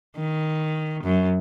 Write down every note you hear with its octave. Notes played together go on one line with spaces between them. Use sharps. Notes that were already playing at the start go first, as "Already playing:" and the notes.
D#3
F#2